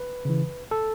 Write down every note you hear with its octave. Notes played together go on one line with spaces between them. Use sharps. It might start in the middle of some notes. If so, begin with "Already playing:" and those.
Already playing: B4
C#3 E3
A4